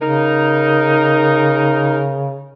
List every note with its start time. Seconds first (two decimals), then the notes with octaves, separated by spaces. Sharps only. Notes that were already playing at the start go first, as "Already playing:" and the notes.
0.01 C#3 D#4 A#4